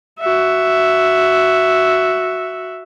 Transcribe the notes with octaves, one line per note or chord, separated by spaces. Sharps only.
F#4 E5